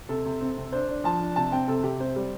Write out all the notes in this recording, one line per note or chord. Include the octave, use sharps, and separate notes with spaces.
C3 A4
C3
C4
C3
D4 C5
D4
F3 A5
D4
C3 A5
C4 G5
C3 A4
C3 G4
C4 C5
G3